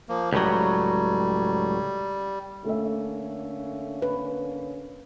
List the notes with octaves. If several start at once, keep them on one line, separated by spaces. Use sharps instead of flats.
F3 A#3
C#2 A2 F#3 G3
D3 A3 A#3 C#4 E5
B4